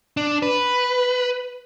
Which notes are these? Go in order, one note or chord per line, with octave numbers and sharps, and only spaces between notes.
D4
B4